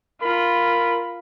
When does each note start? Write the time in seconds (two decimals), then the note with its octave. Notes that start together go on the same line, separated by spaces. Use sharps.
0.22 F4 A#4 B5